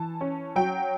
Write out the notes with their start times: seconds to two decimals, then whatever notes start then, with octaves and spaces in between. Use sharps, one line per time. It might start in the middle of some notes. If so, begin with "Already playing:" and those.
Already playing: E3 A5
0.21 C#4
0.56 F#3 G5